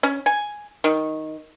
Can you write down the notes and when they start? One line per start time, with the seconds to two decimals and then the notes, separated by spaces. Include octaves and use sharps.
0.03 C#4
0.26 G#5
0.84 D#3